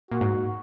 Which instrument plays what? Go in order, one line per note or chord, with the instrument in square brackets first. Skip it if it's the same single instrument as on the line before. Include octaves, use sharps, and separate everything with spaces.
[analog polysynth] A#2 [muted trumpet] F#4
[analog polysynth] G#2